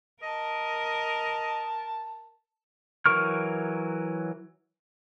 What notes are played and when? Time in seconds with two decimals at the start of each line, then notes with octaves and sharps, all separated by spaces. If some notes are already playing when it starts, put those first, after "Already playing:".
0.23 A#4 D#5 A5
3.06 E3 F#3 A#4 C#6 F6